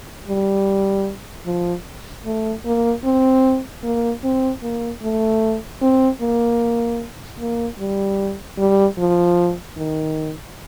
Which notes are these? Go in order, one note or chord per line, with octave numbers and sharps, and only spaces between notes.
G3
F3
A3
A#3
C4
A#3
C4
A#3
A3
C4
A#3
A#3
G3
G3
F3
D#3